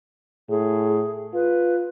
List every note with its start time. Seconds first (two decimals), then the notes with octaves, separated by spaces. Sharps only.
0.49 A2 G#4
1.34 F4 B4